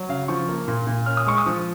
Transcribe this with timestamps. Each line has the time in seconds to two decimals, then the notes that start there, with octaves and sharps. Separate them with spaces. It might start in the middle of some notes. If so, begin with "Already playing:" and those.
Already playing: F#3
0.09 C#3 F5
0.28 F3 C#6
0.49 A#3
0.68 A#2
0.87 A#2
1.06 C#4 F6
1.17 D#6
1.27 G#3 C#6
1.38 D#6
1.46 F3